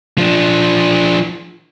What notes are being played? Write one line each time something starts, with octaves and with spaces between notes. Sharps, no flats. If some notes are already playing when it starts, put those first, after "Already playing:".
F3 D4